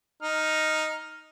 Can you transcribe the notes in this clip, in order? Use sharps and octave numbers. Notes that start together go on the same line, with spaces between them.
D#4 F6